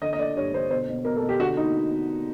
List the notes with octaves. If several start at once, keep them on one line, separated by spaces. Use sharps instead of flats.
D3 D#5
D#5
D3 D5
G2 C#5
D3 C5
B2 C5
B2
B2 A#4
A4
B2
G4
D3 F#4
D#4